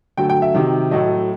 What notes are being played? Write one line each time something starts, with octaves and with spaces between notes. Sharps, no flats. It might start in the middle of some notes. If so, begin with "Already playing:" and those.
D3 F#3 A3 G5
G5
E5
C3 D#3 F#3
A2 F#3 A3 D#5